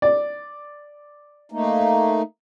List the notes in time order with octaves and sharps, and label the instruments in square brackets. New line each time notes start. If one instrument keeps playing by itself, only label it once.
[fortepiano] D5
[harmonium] A3 A#3 D#4